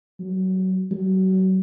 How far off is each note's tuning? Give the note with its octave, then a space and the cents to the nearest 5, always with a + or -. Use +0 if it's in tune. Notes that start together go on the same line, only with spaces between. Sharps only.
F#3 +20
F#3 +30